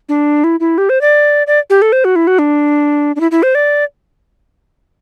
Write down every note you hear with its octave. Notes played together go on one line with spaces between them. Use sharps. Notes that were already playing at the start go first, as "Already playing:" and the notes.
D4
E4
E4
G4
C5
D5
D5
G4
A4
C5
F#4
E4
F#4
D4
D4
E4
E4
C5
D5